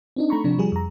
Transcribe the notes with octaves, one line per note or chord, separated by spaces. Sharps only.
C4 D4 D#4
A3 A#5 B5 C#6
C3 F3 D4
F3 G3 G#4
F2 A#5